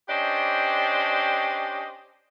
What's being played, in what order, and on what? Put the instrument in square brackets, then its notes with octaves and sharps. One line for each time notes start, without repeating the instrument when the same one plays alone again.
[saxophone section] C#4 D4 G4 C5 D5 D#5